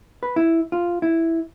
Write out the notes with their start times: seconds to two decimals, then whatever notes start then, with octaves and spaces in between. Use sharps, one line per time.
0.23 B4
0.36 E4
0.72 F4
1.02 E4